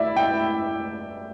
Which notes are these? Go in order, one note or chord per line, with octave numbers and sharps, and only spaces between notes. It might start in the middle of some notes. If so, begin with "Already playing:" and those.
Already playing: E4 D5 E5
G5